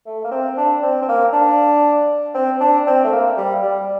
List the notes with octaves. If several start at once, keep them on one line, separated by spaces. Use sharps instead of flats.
A3
A#3
C4
D4
C4
C4
A#3
D4
C4
D4
C4
A3
A#3
G3
G3